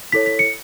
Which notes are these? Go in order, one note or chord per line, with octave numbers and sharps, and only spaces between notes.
E4 A4 C#5 B6
B6
C#7